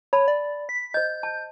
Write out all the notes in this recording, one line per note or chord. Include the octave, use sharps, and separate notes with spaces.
C#5 A5 B5
D5
B6
C5 D#5 G6
A5